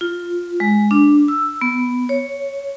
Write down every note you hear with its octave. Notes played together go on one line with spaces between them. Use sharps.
F4
G#3
D4
E6
B3
C#5